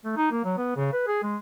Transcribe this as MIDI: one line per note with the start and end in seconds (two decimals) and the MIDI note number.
0.05 0.14 57
0.17 0.26 63
0.31 0.43 58
0.45 0.54 54
0.57 0.72 59
0.76 0.90 49
0.93 1.04 71
1.07 1.20 68
1.23 1.37 56